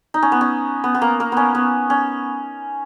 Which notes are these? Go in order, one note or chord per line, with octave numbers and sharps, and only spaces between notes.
D#4
C#4
B3
C#4
B3
B3
A#3
A#3
B3 C#4
B3
C#4